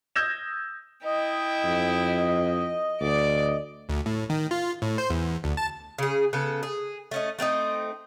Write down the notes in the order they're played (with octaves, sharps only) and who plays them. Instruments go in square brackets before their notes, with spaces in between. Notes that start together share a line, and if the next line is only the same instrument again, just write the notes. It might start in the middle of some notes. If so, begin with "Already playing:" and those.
[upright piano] D#6 E6 G6 G#6 A#6 E7
[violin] E4 G5 [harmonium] D#5
[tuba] F2
[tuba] D2 [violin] D5 D6
[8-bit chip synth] D2
A2
D#3
F4
A2
C5
E2
D2
A5
[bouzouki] C#3 G#4
C#3 B3 A4
G#4
A3 C#4 D#5
A3 C4 C#4 D#4